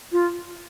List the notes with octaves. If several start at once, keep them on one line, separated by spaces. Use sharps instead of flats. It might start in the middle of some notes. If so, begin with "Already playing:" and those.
F4